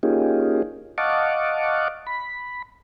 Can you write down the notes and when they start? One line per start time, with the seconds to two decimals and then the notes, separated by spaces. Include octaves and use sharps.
0.03 A#3 C#4 D#4 F4 G4 G#4
0.98 D#5 F5 F#5 A5 C#6 D6
2.07 B5